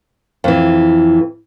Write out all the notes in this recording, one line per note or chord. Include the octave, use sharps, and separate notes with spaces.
F2 E3